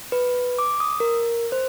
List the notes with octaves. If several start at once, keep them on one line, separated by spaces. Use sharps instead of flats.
B4
D6
D#6
A#4
C5